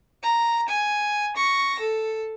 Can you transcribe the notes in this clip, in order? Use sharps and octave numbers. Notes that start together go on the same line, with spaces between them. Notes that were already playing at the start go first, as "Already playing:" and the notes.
A#5
G#5
C#6 A#6
A4